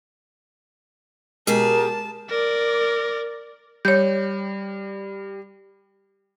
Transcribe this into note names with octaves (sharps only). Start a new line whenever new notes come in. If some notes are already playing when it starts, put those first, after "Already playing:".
B2 G#3 G4 G#4 A#4 A5
A#4 D5
G3 C#5 G6